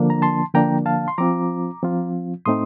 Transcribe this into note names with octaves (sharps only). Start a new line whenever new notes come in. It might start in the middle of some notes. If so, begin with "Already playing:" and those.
Already playing: D3 F3 A#3 D4
A#5
A5 C6
D3 F3 A#3 D4 G5 A#5
F5 A5
C6
F3 C4 F4 A#5 D6
F3 C4 F4
A2 A3 C4 D#4 C6 D#6